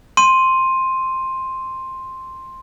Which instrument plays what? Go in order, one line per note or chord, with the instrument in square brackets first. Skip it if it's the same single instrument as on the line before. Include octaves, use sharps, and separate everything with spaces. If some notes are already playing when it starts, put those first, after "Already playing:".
[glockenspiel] C6 D#7